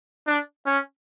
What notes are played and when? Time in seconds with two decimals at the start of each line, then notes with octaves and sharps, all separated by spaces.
0.27 D4
0.66 C#4